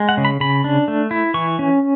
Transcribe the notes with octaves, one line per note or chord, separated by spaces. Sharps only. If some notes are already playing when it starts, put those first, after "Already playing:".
Already playing: G#3
F#5
C#3
B5
C#3 B5
D4
A3
E4
E3 C#6
C#4